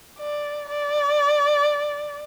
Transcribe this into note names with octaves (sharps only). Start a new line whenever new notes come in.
D5
D5